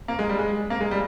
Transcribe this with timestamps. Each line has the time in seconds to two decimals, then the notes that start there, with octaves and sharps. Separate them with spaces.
0.08 A#3
0.19 G#3
0.29 G3
0.39 G#3
0.70 A#3
0.81 G#3
0.91 G3